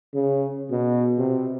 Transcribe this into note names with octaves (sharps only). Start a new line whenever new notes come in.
C#3
B2
C3